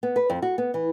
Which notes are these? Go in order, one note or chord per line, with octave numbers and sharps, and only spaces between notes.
B3
B4
F2
F#4
B3
E3